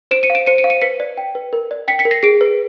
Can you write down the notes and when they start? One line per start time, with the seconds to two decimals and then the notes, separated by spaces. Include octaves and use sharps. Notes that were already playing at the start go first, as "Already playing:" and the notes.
0.11 C5 D7 E7
0.23 C#7 D#7
0.30 F5
0.35 D7 E7
0.46 C5 C#7 D#7
0.58 C#7 D#7
0.64 F5
0.70 C#7 D#7
0.82 B4 B6 C#7
1.00 D5
1.18 G5
1.35 B4
1.53 A#4
1.71 D5
1.88 G5 B6 C#7
1.99 B6 C#7
2.05 A#4
2.11 A#6 C7
2.23 G#4 C7 D7
2.41 B4